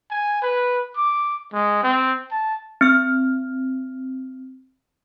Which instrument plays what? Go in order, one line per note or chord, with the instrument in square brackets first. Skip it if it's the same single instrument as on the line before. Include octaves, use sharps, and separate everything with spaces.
[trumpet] G#5
B4
D6
G#3
C4
A5
[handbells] C4 F6